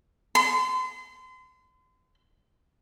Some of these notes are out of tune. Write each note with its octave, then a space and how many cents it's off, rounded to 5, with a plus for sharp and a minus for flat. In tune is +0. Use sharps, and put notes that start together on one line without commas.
C6 -35